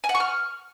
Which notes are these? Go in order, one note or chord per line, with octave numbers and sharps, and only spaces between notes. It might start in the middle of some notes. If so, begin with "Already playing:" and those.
G#5
F#5
C#6
F6